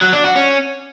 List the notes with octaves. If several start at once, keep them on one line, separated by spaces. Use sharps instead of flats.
F#3
D4
F#4
C#4